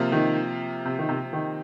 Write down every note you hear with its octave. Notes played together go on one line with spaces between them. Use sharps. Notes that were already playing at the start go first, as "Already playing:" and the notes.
Already playing: C3 F3 A#3 F4
D#3
C3
D#3
C3
D#3